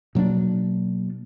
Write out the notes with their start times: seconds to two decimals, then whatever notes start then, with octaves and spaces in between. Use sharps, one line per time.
0.15 B2 F#3 A#3 D4